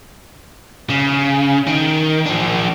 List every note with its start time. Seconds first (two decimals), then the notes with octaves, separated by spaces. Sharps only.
0.90 C#3
1.67 D#3
2.26 F3 D4